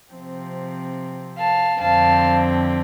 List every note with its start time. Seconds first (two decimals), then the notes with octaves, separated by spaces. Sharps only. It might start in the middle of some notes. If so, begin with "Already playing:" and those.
0.12 C3 F3 C4
1.38 F5 A5
1.80 F2 D3 F3 C4 F5 A5